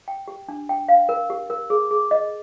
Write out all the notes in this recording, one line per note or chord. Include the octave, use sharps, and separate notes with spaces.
G5
G4
D4
G5
F5
A#4
G4
A#4
G#4
G#4
D#5